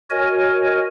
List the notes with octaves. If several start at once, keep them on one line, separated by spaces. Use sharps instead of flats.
F#4 A#4 C#5 D#5 G#5